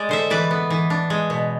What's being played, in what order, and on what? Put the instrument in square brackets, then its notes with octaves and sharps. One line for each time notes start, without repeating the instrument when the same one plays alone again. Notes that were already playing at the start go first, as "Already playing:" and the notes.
Already playing: [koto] G#3 D5
D3 C5 E5
E3 B4 D5
B3
E3
D4
G#3
B2